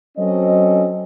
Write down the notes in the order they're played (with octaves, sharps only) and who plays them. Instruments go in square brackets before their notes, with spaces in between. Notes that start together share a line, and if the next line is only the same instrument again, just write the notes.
[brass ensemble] F#3 C4 C#4 A4 C5 D#5